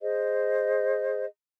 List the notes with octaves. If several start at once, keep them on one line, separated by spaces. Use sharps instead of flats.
G#4 C5 D#5